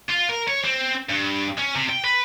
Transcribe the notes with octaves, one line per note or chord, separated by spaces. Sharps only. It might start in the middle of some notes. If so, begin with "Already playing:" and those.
F4
A#4
C#5
C4
G2
C#4
C3
G5
B4